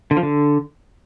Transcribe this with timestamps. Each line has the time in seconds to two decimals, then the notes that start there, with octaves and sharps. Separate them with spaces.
0.11 D3
0.17 F3
0.23 D3